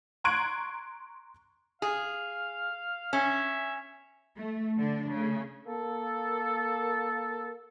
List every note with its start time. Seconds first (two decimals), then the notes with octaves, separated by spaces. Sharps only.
0.24 A#5 C6 C#6 F#6 G#6 D7
1.82 G#4 F5
3.13 C#4 E5
4.37 A3
4.76 D3 D4
5.09 C#3 A3
5.66 A#3 A4